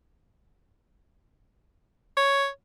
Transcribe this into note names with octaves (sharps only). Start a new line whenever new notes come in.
C#5